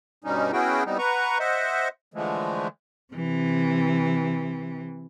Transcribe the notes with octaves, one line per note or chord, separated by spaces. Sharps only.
G2 B2 G3 C#4 D#4
B3 C#4 E4 F#4 G#4 G5
E3 G3 B3 C4 D#4
B4 F#5 A#5 C#6
C5 D#5 E5 F#5
D3 E3 F3 G#3 A3
C3 E3